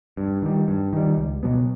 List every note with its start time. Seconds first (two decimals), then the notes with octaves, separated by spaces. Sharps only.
0.17 G2
0.42 D#3 G3
0.68 G2
0.93 D#3 G3
1.18 C#2
1.43 B2 F#3 B3